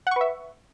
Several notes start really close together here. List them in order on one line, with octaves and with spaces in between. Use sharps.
F#5 C#6 B4 E5